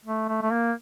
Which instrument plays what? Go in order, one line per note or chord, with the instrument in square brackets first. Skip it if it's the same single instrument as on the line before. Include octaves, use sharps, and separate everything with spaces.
[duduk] A3
A3
A3
A#3